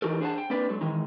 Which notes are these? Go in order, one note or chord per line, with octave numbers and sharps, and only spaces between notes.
E3 D#4 F#4 G4 A4 A#4
D4 G#4 C5 E5 F#5 A5
G5
A#3 C4 D4 B4 D5
F#3 G#3 A4
D#3 E3 G#3 D#4